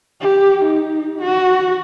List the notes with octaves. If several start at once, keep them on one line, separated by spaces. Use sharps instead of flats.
G4
D#4
F#4